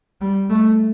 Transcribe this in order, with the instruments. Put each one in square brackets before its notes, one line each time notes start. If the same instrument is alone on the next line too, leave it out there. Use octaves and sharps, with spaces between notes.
[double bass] G3
A3